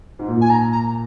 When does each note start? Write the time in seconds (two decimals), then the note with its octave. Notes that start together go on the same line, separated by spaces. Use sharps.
0.19 G#2
0.27 A#2
0.41 G#5
0.50 A#5
0.72 A#5